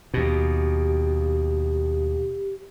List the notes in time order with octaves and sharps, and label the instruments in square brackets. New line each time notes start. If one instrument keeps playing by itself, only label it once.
[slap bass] D#2 B2 [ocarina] G4